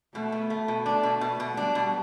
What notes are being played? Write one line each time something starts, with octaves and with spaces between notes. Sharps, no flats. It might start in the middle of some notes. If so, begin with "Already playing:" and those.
B2 A3
B2
A3
B2
A3 D4
B2
B2
B2
G3 D4
B2